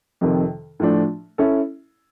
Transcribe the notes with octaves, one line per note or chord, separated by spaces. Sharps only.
F2 C3 D#3
A2 F3 A3 D4
C#4 E4 A4